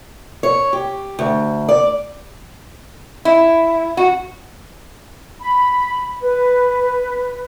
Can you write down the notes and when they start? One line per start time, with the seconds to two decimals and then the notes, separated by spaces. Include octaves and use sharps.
0.43 C#5
0.73 G4
1.19 D2
1.69 D5
3.25 E4
3.97 F#4
5.41 B5
6.21 B4